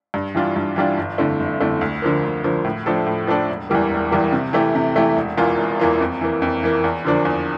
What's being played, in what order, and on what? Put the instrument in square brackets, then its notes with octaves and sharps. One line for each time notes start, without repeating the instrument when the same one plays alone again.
[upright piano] G2
E3 G3 D4 F4
G2
E3 G3 D4 F4
G1
F2 D3 A3 E4
G1
F2 D3 A3 E4
D2
D3 F3 A#3
D2
D3 F3 A#3
A2
F3 A3 D4 A4
A2
F3 A3 D4 A4
E1
E2 E3 G3 A#3
E1
E2 E3 G3 A#3
C3
E3 A3 E4 G4
C3
E3 A3 E4 G4
E1
E2 E3 A#3 F4
E1
E2 E3 A#3 F4
F2
E3 A#3
F2
E3 A#3
E2
D3 F3 A#3 D4
E2